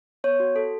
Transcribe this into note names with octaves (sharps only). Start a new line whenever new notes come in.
B3 C#5
F#4
A4